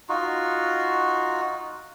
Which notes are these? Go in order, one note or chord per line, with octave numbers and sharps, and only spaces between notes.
D#4 F4 F#4